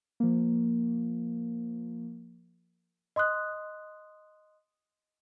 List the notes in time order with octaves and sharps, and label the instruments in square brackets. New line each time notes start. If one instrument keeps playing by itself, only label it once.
[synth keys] F3 A#3
[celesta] D#5 C6 D#6 F#6